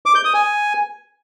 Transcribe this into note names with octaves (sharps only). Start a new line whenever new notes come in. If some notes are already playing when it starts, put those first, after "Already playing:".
D6
G6
D#6
G#5